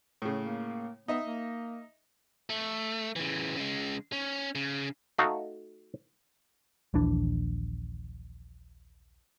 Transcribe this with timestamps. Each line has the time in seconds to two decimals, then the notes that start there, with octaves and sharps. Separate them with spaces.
0.22 A2 C#3
0.43 A#3
1.08 B3 D#4 D#5 E5
1.24 A#3
2.50 A3
3.16 C#3 E3
3.56 C#3 G#3
4.12 C#4
4.55 C#3
5.18 A3 D#4 F#4 F5
6.94 D#1 A#1 E3 D4